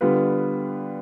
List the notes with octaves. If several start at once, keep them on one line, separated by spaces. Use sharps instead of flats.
D3 G3 B3 F4 B4